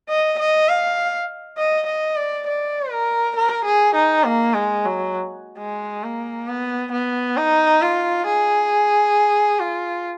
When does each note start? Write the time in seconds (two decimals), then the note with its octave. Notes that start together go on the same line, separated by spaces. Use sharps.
0.09 D#5
0.39 D#5
0.69 F5
1.58 D#5
1.87 D#5
2.17 D5
2.47 D5
2.91 A#4
3.36 A#4
3.65 G#4
3.95 D#4
4.25 A#3
4.54 G#3
4.85 F#3
5.58 G#3
6.03 A#3
6.47 B3
6.92 B3
7.37 D#4
7.82 F4
8.27 G#4
9.60 F4